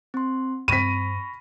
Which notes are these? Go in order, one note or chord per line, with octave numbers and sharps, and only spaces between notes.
C4 C6
G2 C4 B5 C#6 A#6 B6 D#7